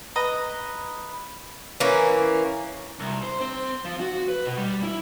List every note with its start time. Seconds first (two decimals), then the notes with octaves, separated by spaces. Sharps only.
0.16 B4 D#5 A#5
1.80 E3 A#3 C#4
3.00 C2
3.23 C5
3.41 C4
3.85 F3
4.00 F#4
4.28 B4
4.45 B2
4.57 G3
4.83 E4